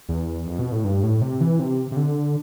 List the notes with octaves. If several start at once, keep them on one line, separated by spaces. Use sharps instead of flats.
E2
F2
B2
A2
G2
A2
C3
E3
C3
C3
D3